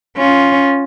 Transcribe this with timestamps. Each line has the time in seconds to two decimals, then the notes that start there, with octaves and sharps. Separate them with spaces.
0.17 C#4 F4